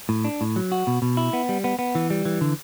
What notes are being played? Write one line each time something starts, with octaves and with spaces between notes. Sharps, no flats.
A2
D4
A2
F#3
F#4
B2
B2
E4
B3
G3
B3
B3
E3
G3
E3
D3